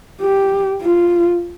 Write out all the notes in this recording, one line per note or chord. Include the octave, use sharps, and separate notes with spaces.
G4
F4